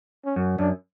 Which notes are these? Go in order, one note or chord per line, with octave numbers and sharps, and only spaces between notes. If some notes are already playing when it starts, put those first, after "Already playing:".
C#4
F#2
F#2 D4